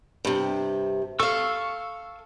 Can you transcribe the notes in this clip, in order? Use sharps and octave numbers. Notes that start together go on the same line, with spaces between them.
G2 C3
A4 F5 C#6 E6